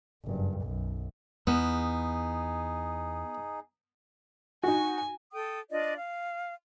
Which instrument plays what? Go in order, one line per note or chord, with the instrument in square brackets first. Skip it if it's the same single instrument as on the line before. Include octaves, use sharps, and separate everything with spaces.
[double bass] F#1 G2
B1 F#2
[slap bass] E2 [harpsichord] B3 [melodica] D#4 G#4
[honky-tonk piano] D#4 F#4 [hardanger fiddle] G#5
[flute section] A4 G5 D#6
D4 F4 D5 D#5
F5